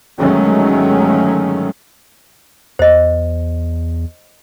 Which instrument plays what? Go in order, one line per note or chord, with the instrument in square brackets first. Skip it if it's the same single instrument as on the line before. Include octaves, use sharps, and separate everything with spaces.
[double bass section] G1 D#3 F#3 G#3 A3 C#4
[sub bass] E2 [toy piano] C5 D#5